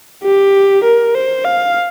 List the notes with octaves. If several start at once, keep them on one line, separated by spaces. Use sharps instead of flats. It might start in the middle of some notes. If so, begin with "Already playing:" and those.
G4
A#4
C5
F5